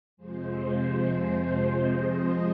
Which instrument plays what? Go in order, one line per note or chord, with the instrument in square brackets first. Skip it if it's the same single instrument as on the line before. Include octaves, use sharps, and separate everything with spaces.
[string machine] F2 C3 F3 G#3 C5
C5
D#5